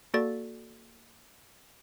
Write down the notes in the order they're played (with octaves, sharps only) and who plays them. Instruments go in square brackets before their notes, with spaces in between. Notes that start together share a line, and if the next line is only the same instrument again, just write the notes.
[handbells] A#3 F#4 A4 D5 A6